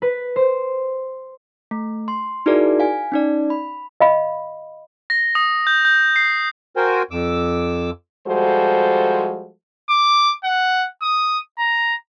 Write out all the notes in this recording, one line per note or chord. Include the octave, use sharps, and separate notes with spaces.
B4
C5
A3
C6
D#4 E4 F#4 G#4 A#4 D5
F5 G#5
C#4 D#4 D5
B5
D#5 F5 B5
A#6
D#6
G6
G6
C7
F#4 A#4 C5 G5 G#5
F2 D6 E6
F3 G3 G#3 F#4 A4 C5
D6
F#5
D#6
A#5